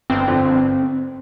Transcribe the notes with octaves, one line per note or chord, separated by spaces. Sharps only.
G1 C4
F2 D3
G1